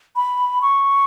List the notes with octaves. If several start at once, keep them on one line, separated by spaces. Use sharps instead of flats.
B5
C#6